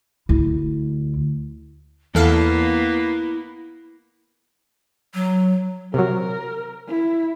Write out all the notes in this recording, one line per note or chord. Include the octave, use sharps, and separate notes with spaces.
D2 E4
E2 A#3 B3 E4 A4 F5
F#3
C3 F#3 A#4
E4